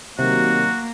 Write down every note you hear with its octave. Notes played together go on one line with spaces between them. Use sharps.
C3 D#3 F#3 A#3 F#4